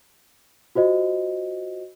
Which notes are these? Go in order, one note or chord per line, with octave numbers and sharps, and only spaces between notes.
F4 F#4 C5 D#5